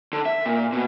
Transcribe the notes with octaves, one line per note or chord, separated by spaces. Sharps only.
D3
E5
A#2
B2